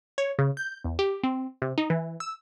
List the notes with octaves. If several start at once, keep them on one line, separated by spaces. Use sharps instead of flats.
C#5
C#3
G6
E2
G4
C4
C3
D#4
E3
E6